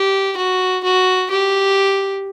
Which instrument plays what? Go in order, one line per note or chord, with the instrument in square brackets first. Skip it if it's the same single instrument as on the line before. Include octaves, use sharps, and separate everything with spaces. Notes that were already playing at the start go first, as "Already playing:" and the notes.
Already playing: [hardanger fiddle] G4
F#4
F#4
G4